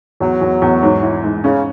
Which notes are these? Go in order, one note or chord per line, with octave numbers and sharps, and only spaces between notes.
E2 F#3
E2
E2
G#2
E4
G#2
C#3 C#4